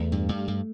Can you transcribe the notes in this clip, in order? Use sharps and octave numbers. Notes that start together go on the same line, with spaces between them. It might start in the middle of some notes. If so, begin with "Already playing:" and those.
Already playing: E2 A3
G2
G2
G2